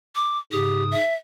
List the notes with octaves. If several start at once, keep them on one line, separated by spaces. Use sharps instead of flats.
D6
G#2 C#3 G4 D#6
E5